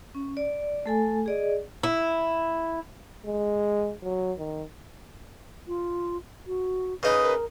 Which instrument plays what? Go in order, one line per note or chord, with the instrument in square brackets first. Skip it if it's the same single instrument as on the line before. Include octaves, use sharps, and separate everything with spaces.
[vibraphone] C#4
D5
A3 A4 G#5
G#4 D5 D#5
[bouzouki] E4
[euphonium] G#3
F#3
D#3
[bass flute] F4
F#4
[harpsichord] C#3 D#4 [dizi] B4
[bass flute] A#4